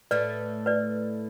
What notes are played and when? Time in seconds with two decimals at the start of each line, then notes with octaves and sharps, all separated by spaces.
0.11 A2 A3 B4 D5
0.66 B4 D5